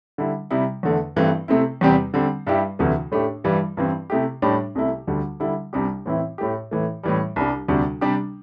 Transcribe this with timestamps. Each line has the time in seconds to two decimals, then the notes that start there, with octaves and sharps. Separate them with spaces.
0.18 D3 G3 E4
0.51 C3 G3 E4
0.83 E2 D3 A3
1.16 G2 E3 A3 C4
1.48 C3 A3 C4 E4
1.81 E2 C3 G3 C4 G4
2.14 D3 G3 C4
2.47 G2 G3 E4 G4
2.79 D2 C3 E3 A3
3.12 A2 A3 D4 G4
3.44 G2 E3 G3
3.77 G2 E3 C4
4.10 C3 A3 E4 G4
4.42 A2 G3 D4 G4
4.75 C2 C3 A3 E4
5.07 D2 D3 G3
5.40 D3 G3 E4
5.73 C2 C3 G3 D4 G4
6.06 A2 E3 C4 E4
6.38 A2 A3 E4 G4
6.71 A2 E3 A3
7.03 A2 E3 G3
7.36 C2 C3 G3 D4
7.68 D2 C3 G3 D4
8.01 C3 G3 D4 G4